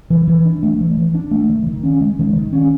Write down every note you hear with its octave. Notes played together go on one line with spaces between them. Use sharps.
E3
E3
D4
A3
E3
E3
D4
A3
D#3
D#3
C#4
G#3
D#3
D#3
C#4